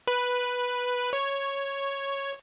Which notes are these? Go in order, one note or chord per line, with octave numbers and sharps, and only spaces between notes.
B4
C#5